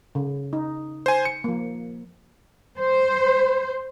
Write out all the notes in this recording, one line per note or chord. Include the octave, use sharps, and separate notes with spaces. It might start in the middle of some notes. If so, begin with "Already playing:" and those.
C#3
D#4
C5 G#5
C#7
F3 A#3
C5